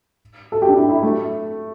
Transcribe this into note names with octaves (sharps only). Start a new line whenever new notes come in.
A4
G4
D4
E4
E4
A3